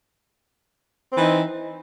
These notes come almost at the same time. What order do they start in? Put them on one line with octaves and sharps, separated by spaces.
C4 E3 D#4